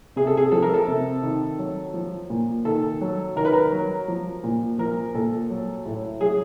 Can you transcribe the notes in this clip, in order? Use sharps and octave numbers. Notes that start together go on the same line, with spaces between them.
C3 G#4
A4
G#4
F3 A4
A#4
A4
C3
D#3
F#3
F3
A#2
D#3 A4
F#3
D#3 A#4
B4
A#4
F#3
F3
A#2
F3 A#4
A#2 A4
F#3
A2
F#3 G#4